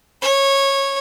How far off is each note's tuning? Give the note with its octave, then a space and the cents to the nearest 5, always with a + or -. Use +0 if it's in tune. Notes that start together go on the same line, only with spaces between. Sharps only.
C#5 -15